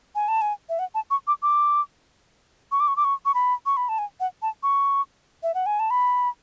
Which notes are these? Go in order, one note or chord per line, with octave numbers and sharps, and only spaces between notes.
G#5
A5
G#5
E5
F#5
A5
C#6
D6
D6
C#6
D6
C#6
D6
C#6
C#6
B5
C#6
B5
A5
G#5
F#5
A5
C#6
E5
F#5
G#5
A5
B5